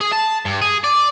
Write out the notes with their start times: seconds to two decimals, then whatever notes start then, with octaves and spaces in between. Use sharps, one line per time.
0.01 G#4
0.13 A5
0.45 G2
0.61 G#4
0.84 D5